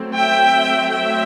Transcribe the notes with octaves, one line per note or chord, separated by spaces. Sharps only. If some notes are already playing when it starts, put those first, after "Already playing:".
Already playing: F#3 A3 C4
E5 G5
E5 G5